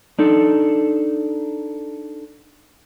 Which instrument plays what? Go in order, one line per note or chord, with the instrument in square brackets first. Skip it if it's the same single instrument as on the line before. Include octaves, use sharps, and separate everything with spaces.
[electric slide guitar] D4 D#4 A4